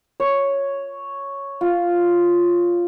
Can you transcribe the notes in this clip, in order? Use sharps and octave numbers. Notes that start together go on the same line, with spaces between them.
C#5
F4